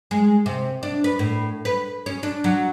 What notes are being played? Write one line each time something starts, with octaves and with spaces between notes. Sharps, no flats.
G#3
C3
D4
B4
A2
B4
C#4
D4
F#3